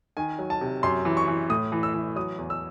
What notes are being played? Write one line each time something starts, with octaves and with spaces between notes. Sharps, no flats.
D#3 G#5
F#3
A5
C3
F#2 C6
E3
C#6
E3
A2 D#6
E3
E6
E3
F#3 D#6
E2
E6